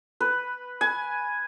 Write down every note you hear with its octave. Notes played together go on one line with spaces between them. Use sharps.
B4
G#5